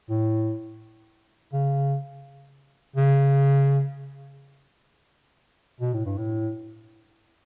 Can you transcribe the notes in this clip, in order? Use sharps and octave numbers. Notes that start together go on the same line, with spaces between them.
A2
C#3
C#3
B2
A2
G2
A2